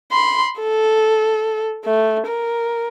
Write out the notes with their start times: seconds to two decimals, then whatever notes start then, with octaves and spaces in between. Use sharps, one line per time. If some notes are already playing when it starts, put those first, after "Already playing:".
0.12 B5 C6
0.60 A4
1.85 A3
2.27 A#4